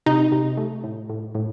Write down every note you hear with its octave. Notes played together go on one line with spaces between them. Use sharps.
C3 D#4
C3
A3
A2
A2
A2